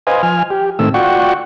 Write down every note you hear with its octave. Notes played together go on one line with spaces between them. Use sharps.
B4 C5 D#5 F5 G#5
F3 G#5 F6
G4
A2 D#3 A3 C4 E6
F4 F#4 D5 F#5 G5 C#6